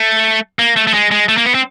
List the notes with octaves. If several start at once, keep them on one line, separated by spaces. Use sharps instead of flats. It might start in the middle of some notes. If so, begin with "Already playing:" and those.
Already playing: A3
A#3
A3
A3
G#3
G#3
A3
A#3
B3
C4